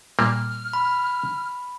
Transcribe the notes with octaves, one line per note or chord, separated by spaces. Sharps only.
A#2 G3 A#3 F6
B5